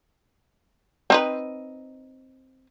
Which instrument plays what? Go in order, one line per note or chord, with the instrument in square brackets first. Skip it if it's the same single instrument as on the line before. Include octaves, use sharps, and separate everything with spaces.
[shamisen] C4 D#4 B4